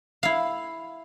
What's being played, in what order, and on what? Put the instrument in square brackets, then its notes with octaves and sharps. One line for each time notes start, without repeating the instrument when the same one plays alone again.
[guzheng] E4 F5